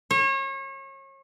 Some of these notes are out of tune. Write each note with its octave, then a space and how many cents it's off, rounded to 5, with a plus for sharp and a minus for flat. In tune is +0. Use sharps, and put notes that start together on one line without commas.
C#5 -35